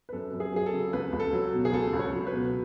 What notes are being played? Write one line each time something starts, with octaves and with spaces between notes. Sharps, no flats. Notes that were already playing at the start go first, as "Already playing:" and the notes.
B4
F#2 A4
F#2
G#4
F#3 G#4
A4
C#3
C#2 B4
C#2
A4
F#3
B2
G#4
C#2 A4
C#2
C#5
F#3
B4
B2